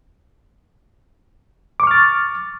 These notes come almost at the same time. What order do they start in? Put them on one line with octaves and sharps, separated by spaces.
D6 C#6 F6 A6